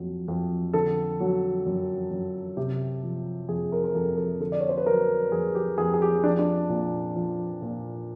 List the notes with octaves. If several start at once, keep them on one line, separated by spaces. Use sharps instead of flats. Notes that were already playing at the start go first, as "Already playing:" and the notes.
Already playing: F2 F#3
F2
D3 A4
F#3
F#2
F#2
C3 G4
F3
F2 G#4
A#4
A#4
F2 A4
A4
D3 A4
D5
C#5
C5
B4
F#3 A#4
F2 G#4
G4
F2 G#4
G#4
G4
F3 D4
D4
A#2
F3
A#2